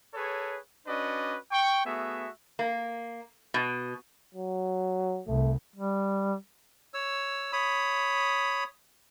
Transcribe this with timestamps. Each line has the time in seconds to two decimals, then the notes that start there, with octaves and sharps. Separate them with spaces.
0.14 G#4 A4 B4 C#5
0.87 C#4 D4 F#4 B4 D5 D#5
1.51 G5 C#6
1.85 A3 B3 F#4 G#4 E5
2.59 A#3
3.54 B2
4.35 F#3
5.28 C2 A3
5.76 G3
6.94 C#5 E6
7.53 C#5 B5 D#6